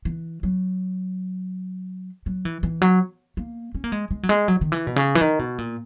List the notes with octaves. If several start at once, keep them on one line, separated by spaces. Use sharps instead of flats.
E3
F#3
F#3
E3
E3
F#3
A#3
C#4
A#3
G#3
G#3
F#3
G#3
F#3
D#3
E3
B2
C#3
E3
D#3
B2
A#2